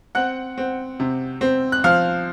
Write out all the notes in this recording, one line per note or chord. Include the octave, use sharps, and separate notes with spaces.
C4 F#5 F#6
C4
C3
C4
F#6
F3 F5 F6